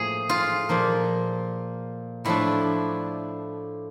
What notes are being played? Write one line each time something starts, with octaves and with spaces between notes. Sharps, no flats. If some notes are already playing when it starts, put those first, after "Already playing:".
Already playing: A2 F3 A#3 G#4
F4
A#2 F3 A#3
A2 F3 A3 D4 E4